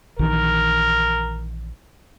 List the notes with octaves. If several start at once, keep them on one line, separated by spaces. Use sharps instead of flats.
A#1 D#3 E3 A#4